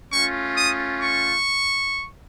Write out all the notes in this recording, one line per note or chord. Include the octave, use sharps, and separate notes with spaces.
A3 C#4 F4 C#6
D#6
C#6